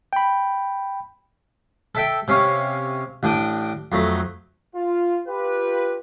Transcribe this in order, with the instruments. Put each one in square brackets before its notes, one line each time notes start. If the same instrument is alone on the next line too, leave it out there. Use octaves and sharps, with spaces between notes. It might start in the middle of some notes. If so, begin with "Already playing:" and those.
[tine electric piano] G5 B5
[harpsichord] A4 E5 G5
C3 C#4 F5 C#6
A1 D4 G5 D#6
F2 F#3 A3
[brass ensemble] F4
F4 G4 B4